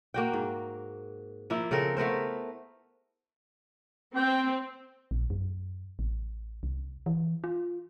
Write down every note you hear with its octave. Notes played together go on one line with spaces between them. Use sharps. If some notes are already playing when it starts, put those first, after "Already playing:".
A#3 F#4 G5
G#2
F3 A#3 E4
C#3 C4 A4 A#4
A3 B3 A#4 C5
C4 G5
A#1
F#2
A1
C2
E3
F4